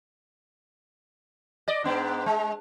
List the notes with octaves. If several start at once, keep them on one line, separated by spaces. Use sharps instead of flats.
D5 D#5
G#2 B3 D4
G#3